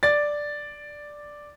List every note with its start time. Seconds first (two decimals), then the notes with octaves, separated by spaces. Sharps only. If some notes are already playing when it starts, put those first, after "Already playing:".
0.03 D5 A6